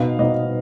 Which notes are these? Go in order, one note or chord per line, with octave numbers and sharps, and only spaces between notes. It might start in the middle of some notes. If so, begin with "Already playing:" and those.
Already playing: B2 B3 D#4 F5
B2 B3 D#4 D#5